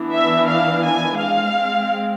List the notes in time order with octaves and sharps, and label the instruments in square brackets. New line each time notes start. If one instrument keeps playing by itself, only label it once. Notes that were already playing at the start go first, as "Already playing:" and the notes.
Already playing: [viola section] E3 B3 D4
E5
F5
G#5
G#3 C4 F5